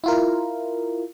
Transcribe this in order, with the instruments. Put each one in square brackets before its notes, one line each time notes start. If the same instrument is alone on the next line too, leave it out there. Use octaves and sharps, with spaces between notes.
[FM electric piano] E4 F4 A#4